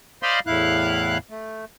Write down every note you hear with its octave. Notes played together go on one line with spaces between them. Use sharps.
C5 D5 D#5 F5 B5 C6
E2 A2 E4 F5 F#6
A3